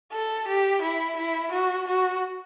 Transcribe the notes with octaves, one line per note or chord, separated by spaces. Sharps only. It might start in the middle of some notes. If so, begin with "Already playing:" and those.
A4
G4
E4
E4
F#4
F#4